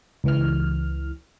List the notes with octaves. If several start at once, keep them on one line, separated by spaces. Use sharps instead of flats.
C#2 E3 F6